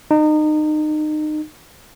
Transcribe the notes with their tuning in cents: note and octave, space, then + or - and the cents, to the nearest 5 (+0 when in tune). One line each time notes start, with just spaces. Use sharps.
D#4 -30